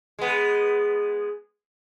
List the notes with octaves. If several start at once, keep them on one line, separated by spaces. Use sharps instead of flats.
G#3 B3